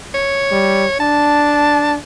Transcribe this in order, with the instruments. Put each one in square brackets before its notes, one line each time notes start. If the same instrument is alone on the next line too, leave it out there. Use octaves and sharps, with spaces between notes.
[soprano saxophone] C#5
[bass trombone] G3
[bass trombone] D4 [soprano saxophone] A5